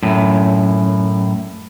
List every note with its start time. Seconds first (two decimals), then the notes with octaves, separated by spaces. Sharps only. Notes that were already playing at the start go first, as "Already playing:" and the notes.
0.03 F#2 A2